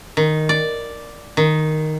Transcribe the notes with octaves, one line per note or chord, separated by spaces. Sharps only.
D#3
D5
D#3